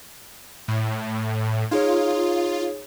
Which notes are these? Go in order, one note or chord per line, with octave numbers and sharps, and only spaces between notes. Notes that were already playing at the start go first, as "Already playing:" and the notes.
A2
D#4 F4 G#4 C#5